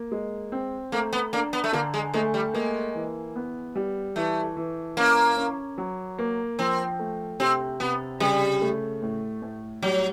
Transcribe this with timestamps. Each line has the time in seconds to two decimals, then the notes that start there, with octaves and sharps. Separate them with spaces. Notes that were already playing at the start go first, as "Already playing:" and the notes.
Already playing: A#3
0.12 G#3
0.52 C4
0.92 A3 A#3
1.13 B3
1.33 A#3 D4
1.53 B3
1.64 A3
1.73 D3 A#3
1.94 G#3
2.14 G#3 A3
2.34 G3
2.54 G#3 A#3
2.95 E3
3.36 B3
3.75 G3
4.16 E3 A3
4.57 E3
4.97 A#3 C#4
5.37 C#4
5.78 F#3
6.19 A#3
6.59 F3 C4
6.99 A3
7.40 C3 C4
7.80 C3 B3
8.20 C#3 G3
8.62 A3
9.02 A2
9.42 A2
9.82 F#3 G3